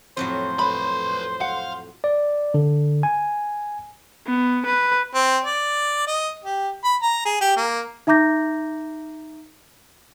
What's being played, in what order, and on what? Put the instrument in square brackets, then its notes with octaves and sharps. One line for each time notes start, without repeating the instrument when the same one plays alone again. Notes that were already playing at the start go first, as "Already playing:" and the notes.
[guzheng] F2 A2 F#3 [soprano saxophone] C5
[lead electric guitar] B4 C6 [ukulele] B5
[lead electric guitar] F5 [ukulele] F#5
[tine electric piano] D5
D3
G#5
[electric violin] B3
B4
[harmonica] C4
D5
D#5
G4
B5
A#5
G#4
G4
A#3
[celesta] D#4 E5 A#5 D6 G6 A#6